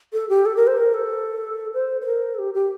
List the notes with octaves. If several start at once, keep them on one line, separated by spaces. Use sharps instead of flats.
A4
G4
A4
A#4
C5
A#4
A4
C5
C5
A#4
A4
G4
G4